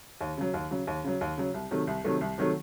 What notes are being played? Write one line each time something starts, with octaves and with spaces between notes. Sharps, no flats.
D#2
C#3 F#3
D#2
C#3 F#3
D#2
C#3 F#3
D#2
C#3 F#3
C2
C3 D#3 F#3 A3
C2
C3 D#3 F#3 A3
C2
C3 D#3 F#3 A3